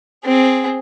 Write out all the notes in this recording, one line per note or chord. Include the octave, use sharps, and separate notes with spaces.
C4 G#4